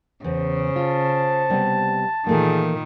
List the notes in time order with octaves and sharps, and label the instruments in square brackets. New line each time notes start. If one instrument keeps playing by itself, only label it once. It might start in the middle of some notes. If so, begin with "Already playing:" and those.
[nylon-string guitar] E2 [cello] C#3 [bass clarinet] C5
[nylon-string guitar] F4 [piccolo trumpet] A5
[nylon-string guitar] C3 G3 B3
[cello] A#2 D#3 [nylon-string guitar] E3 A3 A#3 [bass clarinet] G#4